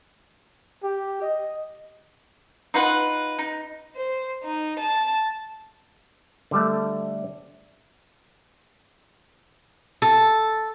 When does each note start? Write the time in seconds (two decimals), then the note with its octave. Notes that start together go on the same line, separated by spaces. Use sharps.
0.83 G4
1.22 D#5
2.74 D#4 F4 B4 F#5
3.39 D#4
3.96 C5
4.43 D#4
4.80 A5
6.51 D3 G3 A3
10.02 A4